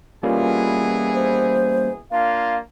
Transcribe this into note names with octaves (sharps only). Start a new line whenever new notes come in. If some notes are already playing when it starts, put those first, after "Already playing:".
B2 E3 G3 A#3 C#4 F4 G#4
C5
A#3 D4 F4 F5